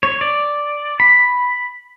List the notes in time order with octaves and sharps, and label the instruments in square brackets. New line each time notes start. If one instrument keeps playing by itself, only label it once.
[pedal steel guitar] C#5
D5
B5